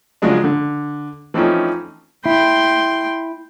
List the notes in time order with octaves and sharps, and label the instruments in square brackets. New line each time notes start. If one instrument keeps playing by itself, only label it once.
[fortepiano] C#3 F3 F#3 G#3 D4
D3
E3 F3 A3 C4 C#4 D#4
[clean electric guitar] E4 [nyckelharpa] G5 C6